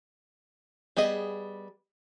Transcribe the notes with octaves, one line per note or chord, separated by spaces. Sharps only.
G3 B3 G#4 D#5